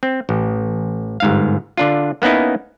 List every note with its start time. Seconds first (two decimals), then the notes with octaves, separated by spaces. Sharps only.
0.03 C4
0.29 A1
1.20 G1 G#2 F5
1.77 D3 D4 F4
2.22 A#3 B3 C#4 D#4 E4